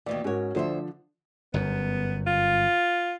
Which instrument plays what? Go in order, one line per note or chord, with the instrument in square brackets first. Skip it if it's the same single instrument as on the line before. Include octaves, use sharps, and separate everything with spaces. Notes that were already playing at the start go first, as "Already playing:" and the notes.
[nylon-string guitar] D#2 B2 E3 [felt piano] D5
[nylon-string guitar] G#2 C#5 [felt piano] C#4 F#4 A#4
[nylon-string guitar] D2 C5 E5 [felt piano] D3 F3 A4
[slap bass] G1 F#2 [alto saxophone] B3
[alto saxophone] F4